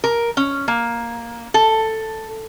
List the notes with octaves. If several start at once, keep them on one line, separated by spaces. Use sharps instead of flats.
A#4
C#4
A#3
A4